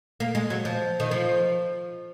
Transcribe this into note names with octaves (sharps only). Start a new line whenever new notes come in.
A#3
G#3
F#3
F3
D#3
F3